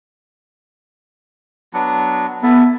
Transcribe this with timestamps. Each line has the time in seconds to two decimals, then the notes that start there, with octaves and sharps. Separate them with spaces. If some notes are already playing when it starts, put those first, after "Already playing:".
1.73 F#3 B3 D4
2.43 B3 E4 A4 E5